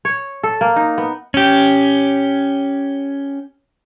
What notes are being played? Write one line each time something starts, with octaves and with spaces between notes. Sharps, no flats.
C#5
A4
A#3
D#4
B3
C#4 G4